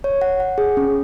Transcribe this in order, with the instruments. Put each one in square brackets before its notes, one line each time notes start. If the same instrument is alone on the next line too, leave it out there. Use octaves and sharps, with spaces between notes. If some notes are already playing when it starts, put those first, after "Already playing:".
[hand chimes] C#5
F#5
F#5
G#4
C#4